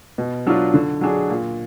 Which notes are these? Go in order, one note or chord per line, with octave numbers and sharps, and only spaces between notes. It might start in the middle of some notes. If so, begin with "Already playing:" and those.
B2
F#3 D4 F4
D3
F#3 D4 G#4
A#2